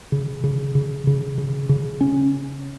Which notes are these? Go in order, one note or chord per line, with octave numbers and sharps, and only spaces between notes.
C#3
C#3
C#3
C#3
C#3
C#3
C#4